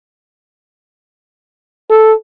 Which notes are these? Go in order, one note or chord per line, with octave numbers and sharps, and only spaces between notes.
A4